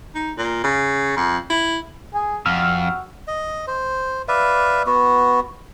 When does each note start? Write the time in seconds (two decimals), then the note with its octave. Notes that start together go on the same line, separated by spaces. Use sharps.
0.15 D#4
0.38 A#2
0.64 C#3
1.17 F2
1.50 E4
2.14 G#4
2.46 F2 F#4 E6 F6
3.28 D#5
3.67 C5
4.28 B4 D5 E5 F5
4.87 B3 F#4